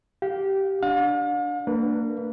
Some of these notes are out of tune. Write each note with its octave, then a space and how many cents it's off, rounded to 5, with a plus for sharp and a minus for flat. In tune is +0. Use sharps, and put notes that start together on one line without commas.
G4 -15 F5 +15
D4 +0 F5 +45
A#3 -30 D4 +0 B4 -15